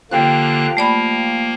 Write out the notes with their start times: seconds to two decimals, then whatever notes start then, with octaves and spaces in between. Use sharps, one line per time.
0.11 D3 F3 A#3 G4 G5 F#6
0.77 A3 A#3 D5 B5